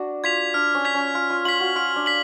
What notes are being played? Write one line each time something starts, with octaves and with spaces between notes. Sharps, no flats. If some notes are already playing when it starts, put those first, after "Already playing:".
Already playing: D4 F#4
F4 G#6 B6 F7
D4 F6
C#4
G#6 B6 F7
C#4
F4 F6
F4
F4 B6 F#7
F#4
F4 F6
D4
B6 F#7